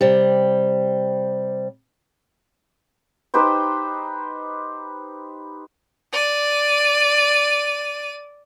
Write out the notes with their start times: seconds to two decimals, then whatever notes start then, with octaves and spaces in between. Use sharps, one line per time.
0.01 C3 G3
3.34 D#4 G4 B4 C5
6.13 D5 D#7